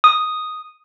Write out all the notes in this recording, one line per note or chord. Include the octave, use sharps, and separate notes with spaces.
D#6